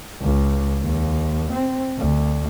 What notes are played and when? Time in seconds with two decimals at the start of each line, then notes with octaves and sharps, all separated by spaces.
0.22 C#2
0.82 D#2
1.53 C4
1.99 D2